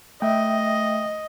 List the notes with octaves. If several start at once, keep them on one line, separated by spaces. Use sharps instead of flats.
A3 D#5 E5 G5